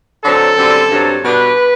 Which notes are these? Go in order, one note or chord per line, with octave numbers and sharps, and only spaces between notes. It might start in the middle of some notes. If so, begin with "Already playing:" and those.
D3 F#3 C4 A4
F#2 D3 G3 C4
G2 F#3 C4
B2 G3 D4 B4